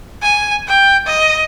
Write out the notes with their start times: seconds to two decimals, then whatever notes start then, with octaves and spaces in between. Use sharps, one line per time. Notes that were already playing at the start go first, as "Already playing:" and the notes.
0.22 G#5
0.68 G5
1.06 D#5